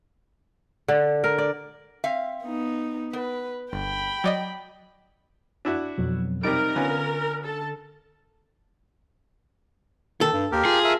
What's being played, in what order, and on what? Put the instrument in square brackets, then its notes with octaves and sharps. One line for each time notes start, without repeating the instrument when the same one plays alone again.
[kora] D3
A#4
D5
[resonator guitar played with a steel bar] C4 E5 F5
[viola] B3 D#4
[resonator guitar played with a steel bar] B3 [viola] B4
[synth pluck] G1 [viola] G5 B5
[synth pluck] F#3 D5 D#5
[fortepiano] D4 E4 F#4
[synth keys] F2 B2 F#3
[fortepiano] C3 G3 [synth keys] D#4 D7 [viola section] A#4
[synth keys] D3 [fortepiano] B3 C#4 F4
[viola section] A4 A5
[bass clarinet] D#3 [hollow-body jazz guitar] A4
[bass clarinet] G2
[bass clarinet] D#2 [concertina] G4 A#4
[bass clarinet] F4 [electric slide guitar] G#4
[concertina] A#4 E5